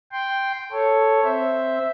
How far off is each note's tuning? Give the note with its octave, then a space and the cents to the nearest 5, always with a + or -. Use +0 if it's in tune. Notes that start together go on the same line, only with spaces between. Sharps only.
G5 +0 C6 +0
A4 +0 C#5 +0
C4 +0 C5 +0 E5 +0